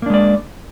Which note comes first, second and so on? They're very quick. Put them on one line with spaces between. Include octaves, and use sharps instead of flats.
A#3 D4 G#3 D5